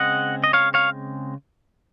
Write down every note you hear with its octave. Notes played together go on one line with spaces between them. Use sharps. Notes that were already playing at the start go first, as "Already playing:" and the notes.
Already playing: C#3 G#3 C4 D#5 F#5
D#5
C#5 F5
C#5 F5